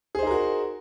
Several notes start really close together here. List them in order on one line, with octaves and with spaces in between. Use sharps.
G#4 C5 D#4 A#4 F#4